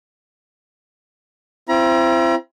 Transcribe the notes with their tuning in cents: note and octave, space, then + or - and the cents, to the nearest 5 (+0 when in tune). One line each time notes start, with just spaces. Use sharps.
C4 -5 E4 +40 A#5 +40